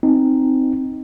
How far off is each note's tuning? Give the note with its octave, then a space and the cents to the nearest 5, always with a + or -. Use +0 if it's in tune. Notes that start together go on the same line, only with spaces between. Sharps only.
C4 +0 D#4 +0